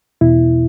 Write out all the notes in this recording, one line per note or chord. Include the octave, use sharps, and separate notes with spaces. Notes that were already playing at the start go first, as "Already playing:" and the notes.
E2 B2 E4